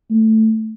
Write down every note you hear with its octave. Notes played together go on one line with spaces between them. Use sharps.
A3